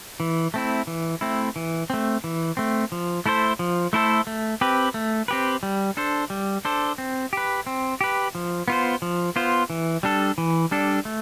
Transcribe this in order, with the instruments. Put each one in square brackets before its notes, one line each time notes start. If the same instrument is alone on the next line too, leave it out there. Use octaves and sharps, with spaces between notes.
[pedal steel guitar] E3
A3 C4 E4
E3
A3 C4 E4
E3
A3 C4
E3
A3 C4
F3
A3 E4 A4 C5
F3
A3 E4 A4 C5
A3
C4 G4 B4
A3
C4 G4 B4
G3
D4 A4 C5
G3
D4 A4 C5
C4
G4 B4
C4
G4 B4
F3
B3 F4 C5
F3
B3 F4 C5
E3
G3 D4 A4
E3
G3 D4 A4
A3